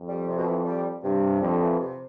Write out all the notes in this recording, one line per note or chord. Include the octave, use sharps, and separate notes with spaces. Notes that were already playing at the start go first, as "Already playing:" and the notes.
Already playing: F2
G3
C3
B2
E3
G3
G2 C3
F2 D3
E3
C3